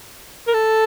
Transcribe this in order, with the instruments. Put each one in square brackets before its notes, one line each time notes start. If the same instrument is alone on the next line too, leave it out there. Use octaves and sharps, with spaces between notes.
[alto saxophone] A#4
A4